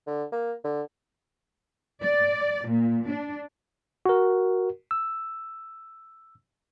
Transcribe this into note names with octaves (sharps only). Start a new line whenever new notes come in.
D3
A#3
D3
D5
A#2
D4
F#4 A#4
E6